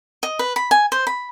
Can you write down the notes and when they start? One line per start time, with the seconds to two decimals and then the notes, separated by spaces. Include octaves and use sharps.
0.23 D#5
0.39 B4
0.56 B5
0.71 G#5
0.92 C5
1.07 B5